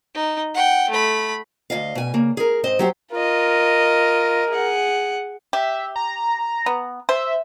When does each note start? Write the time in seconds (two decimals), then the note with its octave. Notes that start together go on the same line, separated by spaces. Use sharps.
0.14 D#4
0.54 F#5 G5
0.89 A3 B5
1.70 D2 G#2 D#5 F5
1.95 B2 G#5
2.14 C#3 A#3
2.37 G#4 A#4
2.63 G#2 C4 C5 D#5
2.79 F#3 G4 C5
3.12 F4 A#4 D#5
4.50 G#4 F#5
5.53 G4 E5
5.96 A#5
6.66 B3
7.09 C5 E5